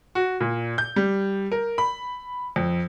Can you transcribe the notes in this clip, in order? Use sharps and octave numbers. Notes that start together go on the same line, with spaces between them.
F#4
A#2
G6
G3
A#4
B5
F2